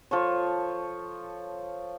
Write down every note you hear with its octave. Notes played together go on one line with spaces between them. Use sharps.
F3 A4 C#5